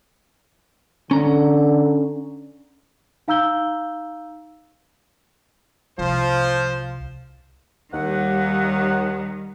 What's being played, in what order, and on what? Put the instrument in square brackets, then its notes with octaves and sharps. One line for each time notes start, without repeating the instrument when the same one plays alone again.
[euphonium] D3 [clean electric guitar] C#4 A#5
[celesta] D#4 F5 A#5 E6 G6 G7
[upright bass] C2 [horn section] F3 C5
[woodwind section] D#2 F#5 [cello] D#3 G3